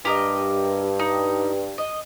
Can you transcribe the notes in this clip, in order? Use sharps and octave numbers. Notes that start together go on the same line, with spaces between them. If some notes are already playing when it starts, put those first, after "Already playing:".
G2 G4 A#4 D#5
D#4
D#5